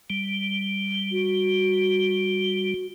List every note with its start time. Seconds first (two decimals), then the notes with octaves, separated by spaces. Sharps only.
0.10 G3
1.12 F#4